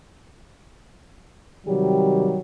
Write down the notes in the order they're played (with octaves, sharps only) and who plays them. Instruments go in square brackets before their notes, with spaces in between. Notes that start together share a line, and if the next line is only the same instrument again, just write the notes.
[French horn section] C3 D#3 F#3 G3 G4